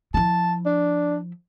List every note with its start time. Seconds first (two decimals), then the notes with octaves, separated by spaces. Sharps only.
0.14 F3 E4 A5
0.66 D4